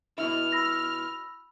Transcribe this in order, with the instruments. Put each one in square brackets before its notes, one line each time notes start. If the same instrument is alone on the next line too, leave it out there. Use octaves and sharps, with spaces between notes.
[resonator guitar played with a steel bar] B2 E4 [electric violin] F6
[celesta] B5 E6 A#6